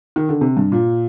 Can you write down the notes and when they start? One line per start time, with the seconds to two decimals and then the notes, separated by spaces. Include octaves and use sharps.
0.16 D#3
0.29 D3
0.41 C3
0.57 G2
0.72 A#2